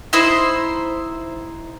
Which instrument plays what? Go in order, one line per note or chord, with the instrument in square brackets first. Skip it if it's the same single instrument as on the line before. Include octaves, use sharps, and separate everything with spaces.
[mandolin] D#4 E4 C5